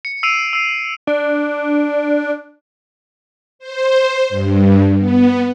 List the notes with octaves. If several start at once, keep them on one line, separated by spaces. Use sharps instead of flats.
C#7
E6 C7 D7 D#7 F7
E6 C7
D4
C5
G2
B3